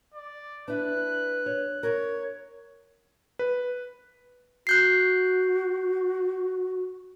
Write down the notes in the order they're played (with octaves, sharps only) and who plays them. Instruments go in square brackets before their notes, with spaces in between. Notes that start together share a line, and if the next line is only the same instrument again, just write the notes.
[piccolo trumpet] D5
[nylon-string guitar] D4 E4 [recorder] B4 [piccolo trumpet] F#6
[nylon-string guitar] C#5
[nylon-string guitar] A#4 [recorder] C#5
[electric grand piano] B4
[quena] F#4 [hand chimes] F#6 G6 C7